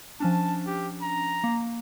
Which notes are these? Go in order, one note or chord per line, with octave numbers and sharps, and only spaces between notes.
F3 C#4 D4 A5
G4
A#5
A#3